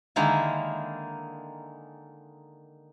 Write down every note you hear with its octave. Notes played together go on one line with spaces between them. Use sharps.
D3 D#3 G#3 A#3 E4